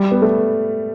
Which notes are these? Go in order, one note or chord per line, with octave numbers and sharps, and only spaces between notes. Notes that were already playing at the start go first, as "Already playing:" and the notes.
Already playing: G3
B3
A3